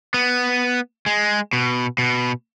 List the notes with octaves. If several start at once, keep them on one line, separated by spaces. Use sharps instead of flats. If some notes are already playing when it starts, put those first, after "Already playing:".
B3
G#3
B2
B2